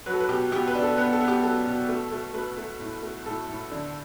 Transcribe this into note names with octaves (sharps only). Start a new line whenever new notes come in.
F#3 B4
A4
B4
B2 G4
B3 G4
B4
D4
A4
B3 B4
A4
B3
G4
F#3 A4
B2
A3
A3
A3 B4
A3
A2
A3
A2 A4
A2
D3